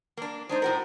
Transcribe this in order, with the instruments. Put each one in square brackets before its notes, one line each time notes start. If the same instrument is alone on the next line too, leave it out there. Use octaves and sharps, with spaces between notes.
[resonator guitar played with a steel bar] A#3 D4
[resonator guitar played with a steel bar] G#3 D4 D#4 [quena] C5
[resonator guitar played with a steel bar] A2 F#4 A#4